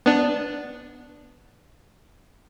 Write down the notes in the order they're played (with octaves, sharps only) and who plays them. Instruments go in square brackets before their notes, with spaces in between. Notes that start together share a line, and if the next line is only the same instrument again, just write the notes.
[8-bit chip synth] B3 D4